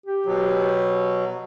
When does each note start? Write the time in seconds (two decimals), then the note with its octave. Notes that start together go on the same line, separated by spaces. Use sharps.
0.06 G4
0.26 B2 F#3